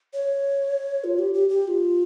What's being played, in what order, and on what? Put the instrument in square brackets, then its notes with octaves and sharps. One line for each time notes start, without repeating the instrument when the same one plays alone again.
[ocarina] C#5
F4
G4
G4
G4
G4
F4